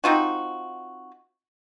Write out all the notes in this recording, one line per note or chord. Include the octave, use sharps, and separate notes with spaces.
C4 D#4 F4 F#4